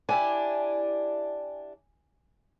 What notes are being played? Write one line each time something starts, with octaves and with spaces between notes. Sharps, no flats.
D4 E4 G4 G#5